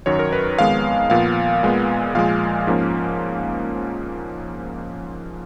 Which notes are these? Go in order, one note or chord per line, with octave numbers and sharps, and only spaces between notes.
F#2 D#3 F#3 C#5
A#4
B4
F2 D#3 G#3 B3 F5
A#2 F3 B3 F5
A#2 G#3 B3
A#2 F3 G#3 F5
G#2 F3 A#3 C#4